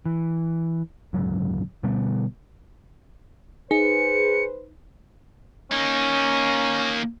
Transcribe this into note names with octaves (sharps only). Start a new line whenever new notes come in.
E3
D1 G1 C#2 F#3
B2 D3 G3 B3
D#4 G#4 B4 C5 C#7
A#3 C#4 D#4